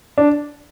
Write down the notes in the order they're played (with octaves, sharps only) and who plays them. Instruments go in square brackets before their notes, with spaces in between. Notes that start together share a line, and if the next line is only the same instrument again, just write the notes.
[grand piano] D4